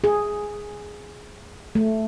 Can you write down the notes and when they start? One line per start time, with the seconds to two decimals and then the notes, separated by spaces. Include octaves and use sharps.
0.04 G#4
1.75 A3